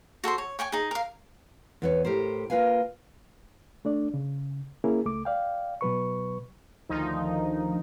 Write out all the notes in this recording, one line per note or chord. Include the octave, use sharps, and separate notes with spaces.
F#4 A4 C5 C6
C#5
C#5 G5 G#5 C#6
D#4 G#4
A#4 F5
E2 B4 C#5
A2 G4 A#4 C5
A#3 F4 B4 F5 G#5
A3 D4 D5
C#3
A#3 C#4 E4 G#4 A#4
C#2 A3 D6
D5 F5 G5
B2 F#3 B4 C#6
D2 D#3 F3 D#4